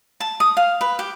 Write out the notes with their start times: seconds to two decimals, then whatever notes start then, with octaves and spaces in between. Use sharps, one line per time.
0.20 A5
0.40 D#6
0.57 F5
0.81 B4
0.99 G4